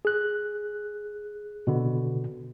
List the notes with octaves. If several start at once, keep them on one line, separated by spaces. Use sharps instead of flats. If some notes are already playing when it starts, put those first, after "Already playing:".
G#4 F#6
B2 D3 B3